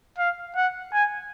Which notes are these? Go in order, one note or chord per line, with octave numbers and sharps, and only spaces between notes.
F5
F#5
G#5